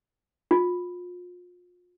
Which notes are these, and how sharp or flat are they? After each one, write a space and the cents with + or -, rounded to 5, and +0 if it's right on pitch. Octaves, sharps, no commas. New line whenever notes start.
F4 +35